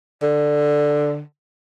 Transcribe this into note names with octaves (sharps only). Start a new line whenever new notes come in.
D3